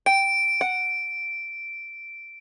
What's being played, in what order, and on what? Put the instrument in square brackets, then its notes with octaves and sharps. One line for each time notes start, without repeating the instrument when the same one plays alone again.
[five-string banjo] G5 [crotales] D7
[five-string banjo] F#5